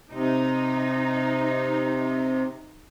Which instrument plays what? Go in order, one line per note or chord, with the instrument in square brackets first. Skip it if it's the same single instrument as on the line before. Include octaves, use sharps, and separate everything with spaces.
[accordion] C3 [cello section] D#4